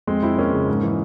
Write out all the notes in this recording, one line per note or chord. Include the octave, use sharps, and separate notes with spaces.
F2 G#3 C4
F2 C4 E4
F2 A#3 C#4
C#3
G#2
E3